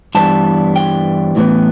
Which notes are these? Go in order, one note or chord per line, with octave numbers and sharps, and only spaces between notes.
G2 E3 G3 B3 A5
G5
A2 E3 B3